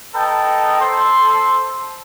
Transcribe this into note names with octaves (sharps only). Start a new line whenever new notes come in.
A4 B4 D#5 G5 A5 A#5
A4 C5 C6